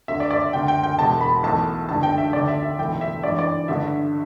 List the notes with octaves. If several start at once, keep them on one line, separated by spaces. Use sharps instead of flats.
D2 D3 E5
D5
D5
E5
D2 D3 G5
G5
G5
E1 E2 B2 A5
B5
B1 A2 E3 A5
G1 G2 D3 A5
G5
E5
D2 D3 D5
E5
E5
B1 A2 E3 G5
E5
A1 G2 E3 D5
D5
A1 G2 D3 E5